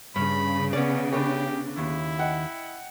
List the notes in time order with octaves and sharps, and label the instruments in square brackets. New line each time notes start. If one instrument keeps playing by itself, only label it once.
[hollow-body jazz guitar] G2 [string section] C#3 [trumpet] B5
[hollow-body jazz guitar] B3 D5 [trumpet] C#4
[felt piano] B3 C#4 D4 [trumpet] G4 [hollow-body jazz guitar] C#5
[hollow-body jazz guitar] D#2 [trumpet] E4
[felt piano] D#5 F#5 G5